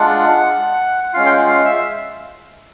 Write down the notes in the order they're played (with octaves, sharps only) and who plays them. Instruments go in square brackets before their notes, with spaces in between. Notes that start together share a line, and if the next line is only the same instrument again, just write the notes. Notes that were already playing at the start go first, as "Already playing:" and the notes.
Already playing: [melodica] G#3 D4 F4 F#5
G#3 C#4 F4 F5
G5
F#5
F5
E5